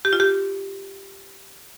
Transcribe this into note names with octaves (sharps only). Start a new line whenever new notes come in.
G4
F4
G4